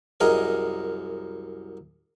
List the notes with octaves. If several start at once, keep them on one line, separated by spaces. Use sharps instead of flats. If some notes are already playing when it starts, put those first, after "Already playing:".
C2 F#2 G#4 A#4 D#5